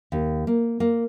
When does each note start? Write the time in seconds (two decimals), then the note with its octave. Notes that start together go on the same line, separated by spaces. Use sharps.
0.12 D#2
0.47 A#3
0.80 A#3